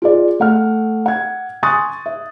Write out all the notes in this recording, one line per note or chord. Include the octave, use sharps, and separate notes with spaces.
F4 G#4 D5
A3 F#5 F6
F#5 G#6
G#5 C6 C#6 D#6 F#6 A6
E5